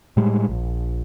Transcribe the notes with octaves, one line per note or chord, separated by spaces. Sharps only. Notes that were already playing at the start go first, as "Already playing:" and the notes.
A2 G3 G#3
A#1